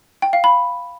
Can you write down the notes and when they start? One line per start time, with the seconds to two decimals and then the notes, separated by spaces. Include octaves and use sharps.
0.22 G5
0.33 F5
0.44 B5